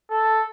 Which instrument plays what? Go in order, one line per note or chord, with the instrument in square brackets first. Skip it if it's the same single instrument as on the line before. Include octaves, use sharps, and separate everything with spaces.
[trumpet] A4